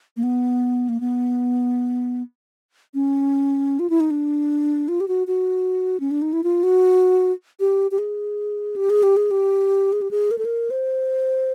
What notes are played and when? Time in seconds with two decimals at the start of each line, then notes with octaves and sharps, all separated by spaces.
0.17 A#3
0.23 B3
0.89 A#3
1.00 B3
2.94 C#4
3.79 F4
3.90 E4
4.00 D#4
4.11 D4
4.88 F4
5.00 G4
5.08 F#4
5.27 F#4
6.00 C#4
6.11 D4
6.22 D#4
6.33 E4
6.44 F4
6.63 F#4
7.60 G4
7.91 G4
7.98 G#4
8.76 G4
8.90 G#4
9.03 G4
9.17 G#4
9.31 G4
9.93 G#4
10.02 G4
10.11 G#4
10.31 A#4
10.38 A4
10.45 A#4
10.70 C5